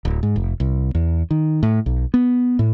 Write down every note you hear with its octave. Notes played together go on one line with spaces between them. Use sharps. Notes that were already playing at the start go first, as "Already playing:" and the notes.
D1
G#2
F1
C2
E2
D#3
A2
B1
B3
A2